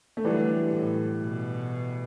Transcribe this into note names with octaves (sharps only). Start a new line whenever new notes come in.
A3
D3 E3 F#3 G3
A2
B2